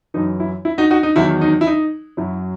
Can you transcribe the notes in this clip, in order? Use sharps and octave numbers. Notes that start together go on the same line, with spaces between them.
F#2 E3 D#4
E4
E4
D#4 F#4
D#4 F#4
D#4
E2 D#3 F#3 E4
D#4
E4
D#4
F#2 F#3 E4